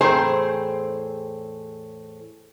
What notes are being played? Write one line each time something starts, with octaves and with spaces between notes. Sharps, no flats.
E2 A2 C4 G#4 C5 A#5